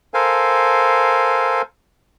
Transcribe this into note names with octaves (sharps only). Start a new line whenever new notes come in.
A4 A#4 C5 F5 G#5